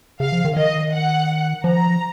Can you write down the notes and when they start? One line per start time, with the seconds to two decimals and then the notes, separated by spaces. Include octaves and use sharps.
0.20 C#3 F5
0.32 F3
0.45 D#3
0.56 D#3 D#5
0.93 F#5
1.64 F3 A#5